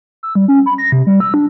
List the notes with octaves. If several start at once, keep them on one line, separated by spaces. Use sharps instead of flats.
E6
G3
C#4
B5
A#6
C3
G3
E6
D4